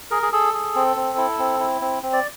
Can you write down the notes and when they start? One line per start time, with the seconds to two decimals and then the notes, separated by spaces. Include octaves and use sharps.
0.11 G#4 A#4
0.22 G#4
0.32 G#4 A4
0.53 G#4
0.75 C4
0.96 C4
1.18 E4
1.39 C4
1.60 E4
1.81 C4
2.03 C4
2.13 D5